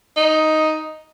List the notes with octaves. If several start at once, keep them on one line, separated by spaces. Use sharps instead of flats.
D#4